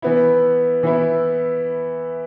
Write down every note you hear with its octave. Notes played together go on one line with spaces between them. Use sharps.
E3 B3 E4
E3 B3 E4